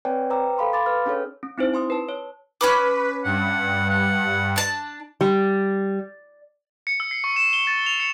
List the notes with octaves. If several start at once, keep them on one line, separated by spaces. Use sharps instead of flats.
C4 B4 C#5 D5 G5 G#5
B4 C5 G5 A#5 D6 E6
A4 F5 B5 C6
F5 G#5 B5 C6 D6 A6
B4 E6 F6
C#4 D4 G#4 A4 C#5
C#4
C4 D#4 E4 C5
G#5 C6 D#6
B4 A5
C#5
C#4 B4 B5 D6
G2 F#5
F#5
D4 A5
G3
C#7
E6
C7
C#6
E7
G7
A6
F7
C#7